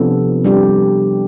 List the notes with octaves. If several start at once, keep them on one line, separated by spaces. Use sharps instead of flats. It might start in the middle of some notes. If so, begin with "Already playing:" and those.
Already playing: C3 F3 B3 D4 A4
G3 D4 G4